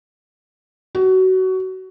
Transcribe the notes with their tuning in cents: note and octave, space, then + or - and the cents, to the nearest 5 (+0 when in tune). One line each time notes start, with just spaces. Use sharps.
F#4 +20